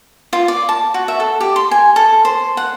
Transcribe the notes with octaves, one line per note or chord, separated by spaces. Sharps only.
F4
D5
A5
F#4
E5
A4
G4
C6
G#5
A4
C5
F#5